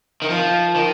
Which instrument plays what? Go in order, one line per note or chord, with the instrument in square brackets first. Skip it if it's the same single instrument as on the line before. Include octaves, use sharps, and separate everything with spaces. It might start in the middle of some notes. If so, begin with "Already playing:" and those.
[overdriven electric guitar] D#3
F3
D#3